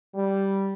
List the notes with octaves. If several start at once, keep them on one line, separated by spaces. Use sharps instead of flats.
G3